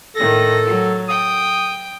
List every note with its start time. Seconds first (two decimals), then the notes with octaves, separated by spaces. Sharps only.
0.15 A2 D#3 A4 A#6
0.65 F#3
1.08 G5 D#6